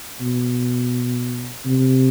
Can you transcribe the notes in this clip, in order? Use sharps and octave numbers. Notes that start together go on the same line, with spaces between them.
B2
C3